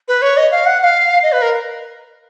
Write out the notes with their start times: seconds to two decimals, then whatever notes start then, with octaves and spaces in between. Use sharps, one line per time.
0.08 B4
0.22 C#5
0.37 D#5
0.51 F5
0.66 F#5
0.80 F#5
0.84 F5
1.23 D#5
1.32 B4
1.42 A#4